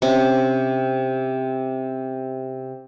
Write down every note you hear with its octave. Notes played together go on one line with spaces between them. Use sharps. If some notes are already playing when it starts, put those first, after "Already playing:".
C3 C#4